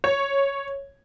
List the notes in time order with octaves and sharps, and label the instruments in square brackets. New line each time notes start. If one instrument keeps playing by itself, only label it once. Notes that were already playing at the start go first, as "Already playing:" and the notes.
[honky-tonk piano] C#5